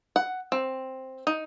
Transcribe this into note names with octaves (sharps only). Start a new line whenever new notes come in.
F#5
C4
D#4